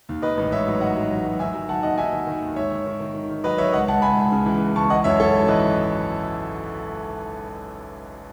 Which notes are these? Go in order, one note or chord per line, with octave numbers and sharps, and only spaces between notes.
D#2
D#3 B4 D#5
A1
G#2 C#5 E5
F#3
D#3 D#5 F#5
F#3
A1
F#3
D#3 E5 G#5
F#3
D#3 F#5 A5
D#2 D#5 F#5
D#3 E5 G#5
D#3
D#3
D#2
G#2 C#5 E5
D#3
D#3
D#3
D#3
D#3
F#3 B4 D#5
D#3 C#5 E5
C#2 D#5 F#5
C#2 F#5 A5
C#2 G#5 B5
C#2
C#3
E3
C#2
C#2 A5 C#6
E3 D#5 F#5
F#2 C#5 E5
F#2 A4 C#5
G#1
E3 B4 D#5